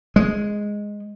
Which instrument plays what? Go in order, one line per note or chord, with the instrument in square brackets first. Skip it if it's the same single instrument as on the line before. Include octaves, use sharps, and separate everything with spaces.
[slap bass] G#3